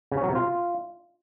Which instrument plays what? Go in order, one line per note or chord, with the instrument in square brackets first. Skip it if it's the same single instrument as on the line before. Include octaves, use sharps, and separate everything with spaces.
[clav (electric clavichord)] C#3
C#4
F#3
C3
F4